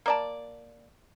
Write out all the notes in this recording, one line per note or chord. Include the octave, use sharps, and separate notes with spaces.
A#3 D5 A5